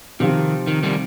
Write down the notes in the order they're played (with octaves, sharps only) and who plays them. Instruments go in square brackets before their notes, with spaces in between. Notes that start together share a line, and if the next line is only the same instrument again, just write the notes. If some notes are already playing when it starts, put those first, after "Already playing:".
[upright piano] C3 F3 C4 F4 [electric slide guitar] D#3
[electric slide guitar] D#3
D#3 G3